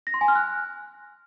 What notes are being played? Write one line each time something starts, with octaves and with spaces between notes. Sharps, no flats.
A#6
C6
G#5
F6
F#6